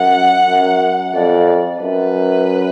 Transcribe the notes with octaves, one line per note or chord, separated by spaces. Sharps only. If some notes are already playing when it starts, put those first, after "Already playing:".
Already playing: F#2 F#5
F#2
F2 D5
F#2 B4